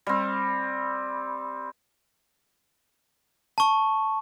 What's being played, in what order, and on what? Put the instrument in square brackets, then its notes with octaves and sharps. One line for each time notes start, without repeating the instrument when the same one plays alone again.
[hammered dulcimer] G3 C4
[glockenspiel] A5 C#6